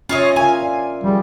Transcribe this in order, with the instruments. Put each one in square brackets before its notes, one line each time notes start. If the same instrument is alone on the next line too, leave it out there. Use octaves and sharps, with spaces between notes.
[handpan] C#4 E5 [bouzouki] F4 C#5 D#5
[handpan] F4 A#4 F5 [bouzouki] G#5
[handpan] D5
[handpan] F3 G#4 [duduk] G3